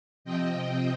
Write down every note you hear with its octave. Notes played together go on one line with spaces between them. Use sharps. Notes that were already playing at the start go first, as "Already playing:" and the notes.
C3 F3 C4 D#5 G5